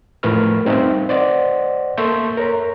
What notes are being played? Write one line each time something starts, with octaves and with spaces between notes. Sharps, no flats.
A2 F3 A#4 B4 C#6 F6
G3 C4 D#4 E5 F5
C5 D5 D#5 F#5
A#3 A4 E5 C6 C#6 G6
A#4 C#5 A#5